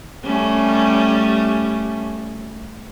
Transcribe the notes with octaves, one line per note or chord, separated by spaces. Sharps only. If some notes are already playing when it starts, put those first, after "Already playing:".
G3 A3 C#4